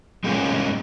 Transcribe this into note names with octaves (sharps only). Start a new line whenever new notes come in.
G3 G#3 A#3 B3 C#4 G#4